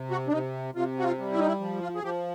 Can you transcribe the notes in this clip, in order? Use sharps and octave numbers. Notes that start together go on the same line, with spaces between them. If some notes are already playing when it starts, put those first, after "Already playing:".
Already playing: C3
F#4
D4
C3 D#4
C3 F4
F#4
F4
G3
E4
D#4
E4
F3
F4
G#4
F3 G4